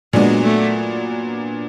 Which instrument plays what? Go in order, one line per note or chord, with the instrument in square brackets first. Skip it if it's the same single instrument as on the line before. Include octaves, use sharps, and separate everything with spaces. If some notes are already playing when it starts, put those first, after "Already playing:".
[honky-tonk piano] A#2 F#3 B3 D4 F#4 [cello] G#3
[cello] A3